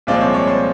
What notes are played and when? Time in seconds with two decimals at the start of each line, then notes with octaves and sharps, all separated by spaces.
0.07 C2 A#2 F3 G#3 C4 D5
0.21 C#5
0.34 C#5
0.47 C5